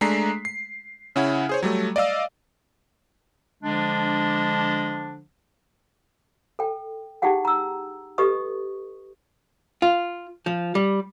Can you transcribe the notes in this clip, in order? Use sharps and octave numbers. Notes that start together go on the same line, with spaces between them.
G#3 A3 D4 A#5 B6 C7
C7
C#3 C#4 E4 F#5
G#4 C5 C#5
F#3 G3 A3
D5 D#5 F5 E6
D3 F3 G#3 D4
A4 G5
D#4 E4 G4 G#4 F#5 G5
A#5 E6
G4 A4 B4 D#5 C#6 D#6
F4
F3
G3